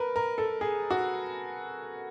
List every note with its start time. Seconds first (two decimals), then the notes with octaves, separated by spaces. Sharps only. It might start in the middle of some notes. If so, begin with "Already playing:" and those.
Already playing: A#4 B4
0.16 A#4
0.38 A4
0.61 G#4
0.91 F#4